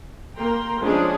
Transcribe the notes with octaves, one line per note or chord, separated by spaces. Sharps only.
A#3 G5 A#5 C6
F3 G#3 C#4 D4 G#4